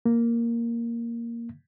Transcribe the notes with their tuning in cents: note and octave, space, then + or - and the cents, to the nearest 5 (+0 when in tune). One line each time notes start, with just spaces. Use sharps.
A#3 +0